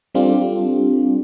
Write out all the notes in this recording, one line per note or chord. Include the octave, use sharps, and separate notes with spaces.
G3 C4 D4 F4 G4 A4